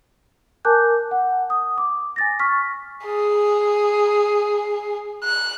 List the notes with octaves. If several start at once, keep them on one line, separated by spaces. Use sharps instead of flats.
A#4 G#5 A5 D6 F#6 G6
F#5
D#6
D6
G#5 A6 A#6
C#6 F6 B6
G#4
F#6